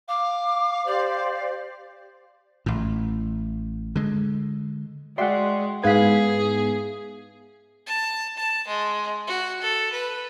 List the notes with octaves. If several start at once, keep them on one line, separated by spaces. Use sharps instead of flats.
F5 D6
G4 C5 D5
A1 A2
D3 G#3
G#3 F#4 D5 E5 F#5 G5 C6
G#2 B3 E4 G#4 B4 F5 G#6 B6
A5
A5
G#3
F#4
A4
B4